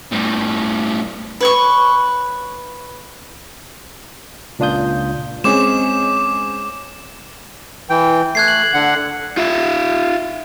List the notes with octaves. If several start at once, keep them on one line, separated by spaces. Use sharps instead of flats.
A2 G3
B4 C#5 C#6
C#2 A#2 D4 F4 D#6 G6
G#3 C4 C#4 G#4 D6 E7
E3 G5
A3 F#6 G#6 C7
F#6 F#7
D3 F#5
F4 E5